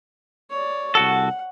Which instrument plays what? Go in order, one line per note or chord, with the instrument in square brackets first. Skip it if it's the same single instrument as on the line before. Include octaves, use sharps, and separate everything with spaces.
[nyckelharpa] C#5 D5
[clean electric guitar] C2 F#4 A4 [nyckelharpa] F#5